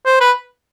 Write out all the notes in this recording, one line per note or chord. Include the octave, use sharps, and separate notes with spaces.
C5
B4